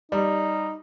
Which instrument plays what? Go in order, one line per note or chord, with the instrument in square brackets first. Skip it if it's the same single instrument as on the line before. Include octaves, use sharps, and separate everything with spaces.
[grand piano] G3 [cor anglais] D#4